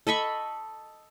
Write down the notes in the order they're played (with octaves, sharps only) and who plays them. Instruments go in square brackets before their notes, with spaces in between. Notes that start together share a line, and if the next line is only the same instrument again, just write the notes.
[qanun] A4 D#5 B5 C#6